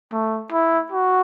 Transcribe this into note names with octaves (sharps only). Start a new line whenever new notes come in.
A3
E4
F#4